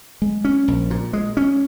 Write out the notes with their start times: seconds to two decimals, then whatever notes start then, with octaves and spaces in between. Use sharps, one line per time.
0.22 G#3
0.45 C#4
0.68 A#1
0.90 A#2
1.13 G#3
1.37 C#4